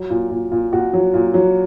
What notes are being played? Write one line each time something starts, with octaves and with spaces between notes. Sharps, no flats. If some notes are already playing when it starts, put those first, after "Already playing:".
Already playing: F#3
A#2
A#2
A#2
A#2 F#4
F#3
A#2
F#3